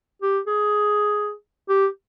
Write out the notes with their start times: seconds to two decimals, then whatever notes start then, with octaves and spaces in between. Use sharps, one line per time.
0.22 G4
0.47 G#4
1.69 G4